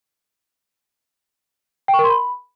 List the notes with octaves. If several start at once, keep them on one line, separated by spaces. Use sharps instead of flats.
G5
C#6
A#4
C6
B5